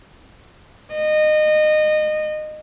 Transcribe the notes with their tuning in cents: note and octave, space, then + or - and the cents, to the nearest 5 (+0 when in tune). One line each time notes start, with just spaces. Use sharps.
D#5 -25